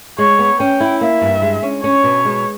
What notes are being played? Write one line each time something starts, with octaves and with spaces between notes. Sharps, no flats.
G#3 C#5
B3
C#4 G5
E4
A#3 E5
G2
G#3
C#4
C#4 C#5
B2
G#3